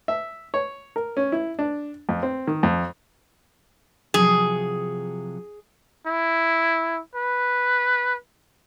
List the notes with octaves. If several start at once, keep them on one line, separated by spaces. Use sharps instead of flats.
E5
C#5
A#4
C#4
E4
D4
F2
C4
D#3
F2
C3 F3 F#3 G#4
E4
B4